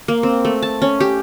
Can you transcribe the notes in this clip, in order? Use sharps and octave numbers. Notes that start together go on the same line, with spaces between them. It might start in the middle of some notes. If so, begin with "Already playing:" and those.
A#3
C4
A3
A5
C#4
G4